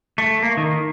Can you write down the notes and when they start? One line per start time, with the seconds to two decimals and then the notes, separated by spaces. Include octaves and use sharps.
0.18 A3
0.43 A#3
0.57 D#3